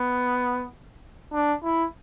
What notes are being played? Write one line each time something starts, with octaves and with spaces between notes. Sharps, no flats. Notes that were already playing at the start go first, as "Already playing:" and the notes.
Already playing: B3
D4
E4